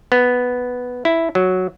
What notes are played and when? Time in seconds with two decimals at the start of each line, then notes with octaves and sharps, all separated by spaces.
0.12 B3
1.05 E4
1.35 F#3